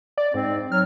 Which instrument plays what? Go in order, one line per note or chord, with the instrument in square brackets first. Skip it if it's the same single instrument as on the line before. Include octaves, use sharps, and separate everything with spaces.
[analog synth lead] D5
[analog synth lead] G#2 [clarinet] C4
[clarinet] F#3 [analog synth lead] F6